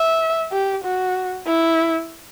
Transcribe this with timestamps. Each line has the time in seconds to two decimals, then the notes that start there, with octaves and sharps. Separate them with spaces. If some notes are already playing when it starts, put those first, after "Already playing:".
Already playing: E5
0.52 G4
0.84 F#4
1.47 E4